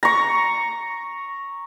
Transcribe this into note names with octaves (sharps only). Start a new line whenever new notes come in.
A#5 C#6